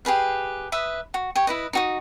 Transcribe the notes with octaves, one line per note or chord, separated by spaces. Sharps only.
G4 G#4 B4 F5
B4 E5 D#6
F#4
G4 C#5
E4 B4 D#5
D#4 F#4 D#6